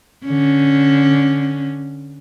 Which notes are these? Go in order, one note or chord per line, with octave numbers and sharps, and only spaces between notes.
D3 C#4